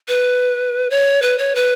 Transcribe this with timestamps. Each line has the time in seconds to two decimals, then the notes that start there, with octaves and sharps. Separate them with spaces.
0.08 B4
0.90 C#5
1.22 B4
1.38 C#5
1.55 B4